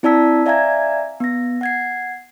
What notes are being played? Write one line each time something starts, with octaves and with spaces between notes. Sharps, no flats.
C4 E4 D5 A5 E6 B6
D5 E5 F5 G#5 A#5 G#6
B3 A#6
F#5 G#6 C7